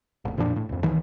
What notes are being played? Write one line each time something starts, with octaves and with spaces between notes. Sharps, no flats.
E1 A1
F2 A#2 F3 D4
A2
D1 F2
C#2 D#3 E3